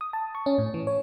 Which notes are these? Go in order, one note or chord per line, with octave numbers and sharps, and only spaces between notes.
D#6
A5
C#6
C#4
A2
E3
C#5